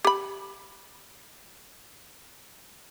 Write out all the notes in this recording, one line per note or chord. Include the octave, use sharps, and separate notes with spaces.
G4 B5